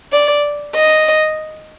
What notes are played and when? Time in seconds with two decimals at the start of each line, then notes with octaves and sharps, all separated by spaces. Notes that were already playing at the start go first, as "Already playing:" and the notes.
0.12 D5
0.75 D#5